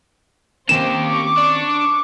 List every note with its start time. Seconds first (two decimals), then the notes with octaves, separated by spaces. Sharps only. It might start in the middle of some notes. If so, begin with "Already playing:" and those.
0.69 D#3 A#3 C4 C#4 G4 C5 E7
1.05 C#6 D6
1.38 D4